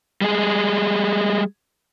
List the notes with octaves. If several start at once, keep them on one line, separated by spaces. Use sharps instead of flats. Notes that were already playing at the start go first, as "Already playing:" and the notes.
G3 G#3 G#4